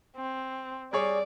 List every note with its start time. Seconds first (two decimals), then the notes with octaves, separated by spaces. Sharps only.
0.16 C4
0.93 G3 G#4 C#5 D5